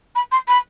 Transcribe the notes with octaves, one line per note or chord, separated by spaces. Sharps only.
B5
C6
B5